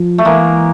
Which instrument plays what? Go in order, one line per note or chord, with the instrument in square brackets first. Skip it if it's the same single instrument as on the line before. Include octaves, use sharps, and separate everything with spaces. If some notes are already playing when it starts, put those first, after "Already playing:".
Already playing: [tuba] F3
[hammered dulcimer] A3
[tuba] E3 [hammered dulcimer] G#3 A#3